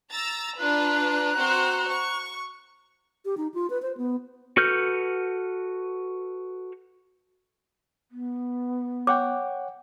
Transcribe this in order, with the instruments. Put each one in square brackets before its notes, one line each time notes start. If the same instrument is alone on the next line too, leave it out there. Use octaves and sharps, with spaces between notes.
[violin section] A#5 E6 A6
[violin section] D4 F4 B4 [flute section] A#5 F#6
[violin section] C4 F#4 C5
C#6
[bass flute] G4
D#4
F4
B4
C5
B3
[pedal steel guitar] F#4 A4 B4 F6 G6
[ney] B3
[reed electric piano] C#5 F#5 G5 [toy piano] D6